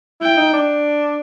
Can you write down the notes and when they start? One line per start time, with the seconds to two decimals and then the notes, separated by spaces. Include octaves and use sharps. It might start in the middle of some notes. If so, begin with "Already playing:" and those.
0.21 E4 G5
0.37 D#4
0.54 D4